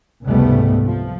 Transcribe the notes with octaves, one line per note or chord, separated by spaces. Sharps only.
F1 C#2 G#2 G3 A3 B3
F3